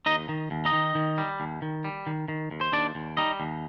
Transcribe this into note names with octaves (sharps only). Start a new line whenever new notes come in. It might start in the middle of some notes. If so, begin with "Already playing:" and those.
D#2 D#4 D#5
D#3
D#2
D#4 D#5
D#3
D#3
G3
D#2
D#3
G3
D#3
D#3
D#2
C5
D#2 D4 D5
D#2
G3 D#4 D#5
D#2